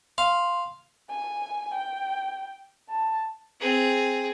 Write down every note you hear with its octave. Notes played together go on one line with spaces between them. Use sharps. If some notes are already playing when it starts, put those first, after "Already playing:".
F5 C6
G#5
G5
A5
C4 G#4